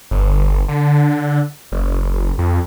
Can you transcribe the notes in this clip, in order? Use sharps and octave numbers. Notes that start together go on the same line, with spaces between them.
G1
D3
F#1
F2